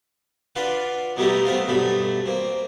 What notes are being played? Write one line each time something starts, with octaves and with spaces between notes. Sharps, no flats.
D4 F4 B4 F5 F#5
B2 F#3 G3 A3 D#4 E4
A3 B3 C4 E5 F5
B1 G2 A3 B5
A#3 C4